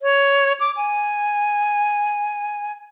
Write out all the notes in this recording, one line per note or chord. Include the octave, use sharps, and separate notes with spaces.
C#5
D6
G#5